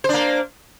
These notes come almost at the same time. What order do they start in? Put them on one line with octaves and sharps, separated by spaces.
C5 D4 A#3